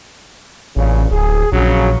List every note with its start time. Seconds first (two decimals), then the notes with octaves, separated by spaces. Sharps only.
0.76 A1 G2 A#2 C#3
1.11 D1 G#4
1.52 A#1 C#3 F#3